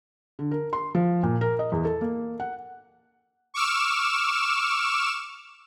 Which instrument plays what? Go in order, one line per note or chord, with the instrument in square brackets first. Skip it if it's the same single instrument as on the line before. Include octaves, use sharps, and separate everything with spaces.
[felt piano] D3
A#4
C6
F3
A#2
A#4
D#5
E2
A4
A#3
F#5
[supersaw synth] C#6 D6 E6 F6 E7